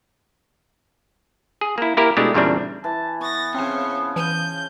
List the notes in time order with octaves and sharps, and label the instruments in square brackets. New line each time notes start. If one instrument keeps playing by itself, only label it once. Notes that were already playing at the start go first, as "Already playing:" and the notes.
[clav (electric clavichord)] G#4
A#3 E4
A#3 E4 G4 A#4
B2 G#3 A3 D4 E4 G4
E2 A#2 C#3 G3 C4 D4
[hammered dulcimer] E3 [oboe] A5
[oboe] B3 [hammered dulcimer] C#6 [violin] A6 A#6
[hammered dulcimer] C#3 F3 [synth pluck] C4 G#5 [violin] C5 C#5
[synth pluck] E3 D#7 [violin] G6